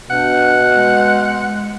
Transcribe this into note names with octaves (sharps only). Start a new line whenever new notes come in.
B2 D4 F#5
G#3